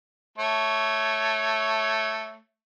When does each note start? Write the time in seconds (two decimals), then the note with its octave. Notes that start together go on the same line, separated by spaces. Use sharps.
0.38 A3 C#5